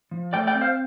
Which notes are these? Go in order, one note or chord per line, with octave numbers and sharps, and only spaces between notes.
F3
A3 D5 G5
D5 G5
C4
C5 F5